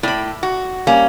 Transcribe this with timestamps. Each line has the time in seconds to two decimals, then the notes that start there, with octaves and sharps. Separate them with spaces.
0.03 A2 D5 B5
0.43 F#4
0.87 G3 A#3 C#4